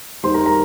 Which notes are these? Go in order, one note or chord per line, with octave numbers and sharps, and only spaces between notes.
D#2 D#3 G3 C5 C6
A#4 A#5
A#4 A#5